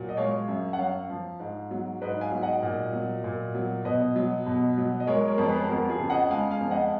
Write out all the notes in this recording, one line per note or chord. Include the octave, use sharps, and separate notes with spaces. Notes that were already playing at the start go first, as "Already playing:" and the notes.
Already playing: A#2 F#3
D#5
G#3 C#5 F5
F#2
F#5
F#2 C#5 F5
F3
G#2
F#3
G#2 B4 D#5
F5 G#5
F#3
D#5 F#5
A#2
F#3
A#2
F#3
B2 B4 D#5
F#3
B2
F#3
D#5
G#3 A#4 C#5
A#4 C#5
F2
G#4 B4
F2 F#4 A#4
F4 G#4
C#3
D#5 F#5
G#3 F5 G#5
F5 G#5
F2
D#5 F#5